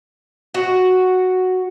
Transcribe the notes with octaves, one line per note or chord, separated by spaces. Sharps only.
F#4